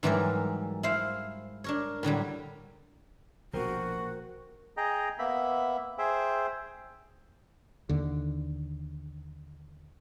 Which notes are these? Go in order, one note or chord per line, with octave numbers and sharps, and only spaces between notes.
G#2 E3 F#3 G3 A#4 D5
E4 C5 F5
D4 A#4 C#5
A2 D3 F#3 G3
A#1 B2 F#4 A#4 C5 G5
G#4 D#5 G5 A#5
A#3 B3 E5 B5
G#4 C5 E5 G5
D#2 D3